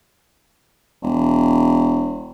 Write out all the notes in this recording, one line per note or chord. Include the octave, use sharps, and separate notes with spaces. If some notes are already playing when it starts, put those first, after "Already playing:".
E1